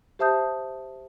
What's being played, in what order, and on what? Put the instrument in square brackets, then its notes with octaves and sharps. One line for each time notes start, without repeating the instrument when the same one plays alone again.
[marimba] G4 C5 E5 A5 D#6 G6